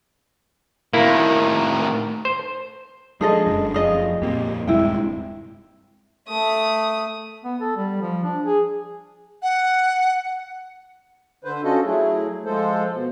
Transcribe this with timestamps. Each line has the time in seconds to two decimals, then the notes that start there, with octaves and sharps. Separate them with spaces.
0.93 A2 D#3 A#3 E4 A#5
2.25 C5
3.21 F3 G#3 D4 G#4 A4 D#5
3.47 F1 F#2
3.74 F3 A3 F4 G#4 D#5
4.22 F2 A#2 A#3 C4 G4
4.67 D#1 G2 C3 G#3 E4 G5
6.28 A3 D#6
7.45 B3
7.61 A4
7.77 G3
8.02 F3
8.24 D4
8.44 G#4
9.43 F#5
11.44 D3 B4 C5
11.64 C#4 D4 F4 F#4 A4 D#5
11.85 F#3 A3 E4 G#4
12.45 F3 G#3 A4 C5
12.92 B2